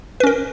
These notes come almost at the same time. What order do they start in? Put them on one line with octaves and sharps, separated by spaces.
B4 C#4 A#4